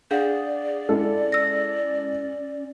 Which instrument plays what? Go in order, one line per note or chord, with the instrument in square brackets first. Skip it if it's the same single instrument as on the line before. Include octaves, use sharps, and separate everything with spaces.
[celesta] D4 F5 F#5 [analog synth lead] G#4 [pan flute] D5
[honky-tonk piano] G#3 E4 A4 [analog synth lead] C#4
[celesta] E6 A#6